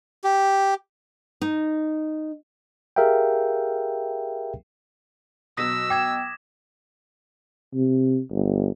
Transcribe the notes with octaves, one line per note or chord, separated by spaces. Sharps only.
G4
D#4
G4 G#4 A#4 E5 F5 G5
B2 F#3 D#6 E6 A#6 B6
G5 D6 G#6 E7
C3
G1